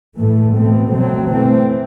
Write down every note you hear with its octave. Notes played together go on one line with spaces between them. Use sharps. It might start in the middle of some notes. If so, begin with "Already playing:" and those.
A2 E3 A3
B2 A3 C4
B2 F#3 A3 C4
E3 A3 C4